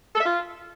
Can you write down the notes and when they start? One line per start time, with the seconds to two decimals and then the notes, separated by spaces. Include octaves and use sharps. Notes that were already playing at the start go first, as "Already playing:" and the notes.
0.16 A4
0.21 E5
0.26 F4